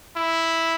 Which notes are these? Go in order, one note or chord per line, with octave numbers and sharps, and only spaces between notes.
E4